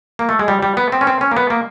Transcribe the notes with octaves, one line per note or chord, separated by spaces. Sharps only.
A#3
A3
G#3
G3
G3
B3
C4
C#4
C4
C#4
A#3
B3
A#3